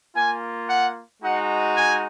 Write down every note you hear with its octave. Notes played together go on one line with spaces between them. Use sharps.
A#3 F4 G#5
F#5
G#3 D#4 F#4 F#5
G#5